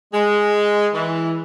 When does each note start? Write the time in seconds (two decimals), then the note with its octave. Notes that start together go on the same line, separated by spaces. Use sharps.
0.13 G#3
0.94 E3